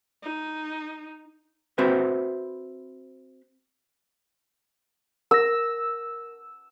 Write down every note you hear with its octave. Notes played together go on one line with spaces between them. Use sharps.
D#4
C4 F#4 B4 C5 E5
A#4 E6 A#6